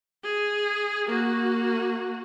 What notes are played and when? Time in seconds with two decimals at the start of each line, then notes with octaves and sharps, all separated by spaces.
0.24 G#4
1.07 A#3 F#4